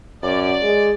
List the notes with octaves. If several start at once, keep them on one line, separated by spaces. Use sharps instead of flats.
F#2 D5
G#3